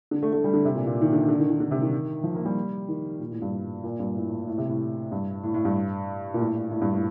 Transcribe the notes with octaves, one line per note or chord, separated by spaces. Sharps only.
D3
A3
A3
G3
D3
C3
A#2
A#2
D#3
D3
D3
D#3
D#3
D3
C3
D#3
F3
A#3
G3
D#3
A#2
A2
G2
A2
A#2
G2
A2
A2
A2
C3
A2
G2
A2
A2
G2
A#2
A2
A2
G2
A2